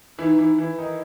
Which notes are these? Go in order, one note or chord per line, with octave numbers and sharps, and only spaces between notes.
E3 D#4 E4
E3 E4
E3 E4
D#3 D#4